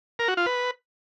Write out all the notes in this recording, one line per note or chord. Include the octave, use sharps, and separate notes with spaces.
A#4
F#4
F4
B4